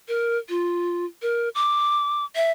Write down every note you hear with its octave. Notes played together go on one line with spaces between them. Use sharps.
A#4
F4
A#4
D6
E5